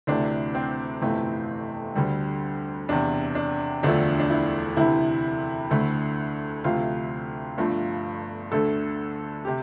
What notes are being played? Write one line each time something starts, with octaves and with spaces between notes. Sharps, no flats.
D2 C3 E3 A3 D4
C4
G1 F2 C3 E3 A3
D2 D3 G3
E1 E2 C3 D4
D4
E1 D2 D3 F3 A3 D4
D4
E4
D2 C3 E3 E4
D2 D3 A3
D2 C3 F3 A3 F4
G1 G2 F3 A3
D2 D3 A3 A4
C3 G4